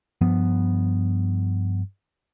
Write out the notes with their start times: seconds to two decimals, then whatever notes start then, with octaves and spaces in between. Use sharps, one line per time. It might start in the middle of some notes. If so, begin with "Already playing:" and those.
0.21 G2 F3 B3